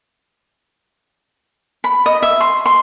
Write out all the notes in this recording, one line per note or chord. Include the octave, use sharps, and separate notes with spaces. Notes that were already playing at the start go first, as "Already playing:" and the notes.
B5
D#5
E5
C6
C6